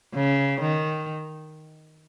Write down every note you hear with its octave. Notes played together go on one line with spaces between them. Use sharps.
C#3
D#3